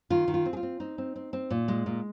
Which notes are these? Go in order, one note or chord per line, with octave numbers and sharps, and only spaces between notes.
D#3 F4
D#3
F4
C4
G#4
F4
C4
C4 D#4
C4
C4
C4
A#2
G#3
A#2